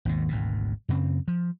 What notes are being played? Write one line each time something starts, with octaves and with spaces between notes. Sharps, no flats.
G#1 D#2 B2
G#1 D2 B2
F#2 C#3 C4
F3